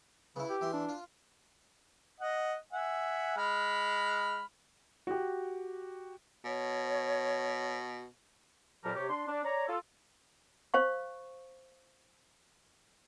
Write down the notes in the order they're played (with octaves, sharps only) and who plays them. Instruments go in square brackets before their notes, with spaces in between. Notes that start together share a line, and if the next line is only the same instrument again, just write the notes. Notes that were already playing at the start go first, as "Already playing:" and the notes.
[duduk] C#3 [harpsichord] B3 E4
[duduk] G4
[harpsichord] E2 E5 C6
[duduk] D4
[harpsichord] F4
[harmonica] D#5 F#5
E5 F#5 G#5
G#3 B5 F6
[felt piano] F#4 G4
[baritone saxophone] B2 [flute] C#5
[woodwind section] F2 A#2 F#3 G3 A#4 A5
C3 G4 C#5
D4 C6
D4
C#5 D5 A#5
F4 A4
[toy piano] C5 F5 C#6